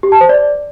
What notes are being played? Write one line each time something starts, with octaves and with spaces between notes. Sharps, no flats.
G4
A5
C5
D5